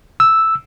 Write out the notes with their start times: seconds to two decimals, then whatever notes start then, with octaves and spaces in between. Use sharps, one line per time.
0.20 E6